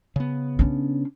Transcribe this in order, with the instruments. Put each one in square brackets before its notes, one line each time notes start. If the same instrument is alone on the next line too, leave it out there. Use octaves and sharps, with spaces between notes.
[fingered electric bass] C#3 B3
[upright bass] C#4 D4